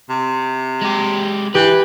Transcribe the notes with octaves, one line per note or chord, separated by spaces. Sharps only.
C3
G#3 G4
E3 G4 B4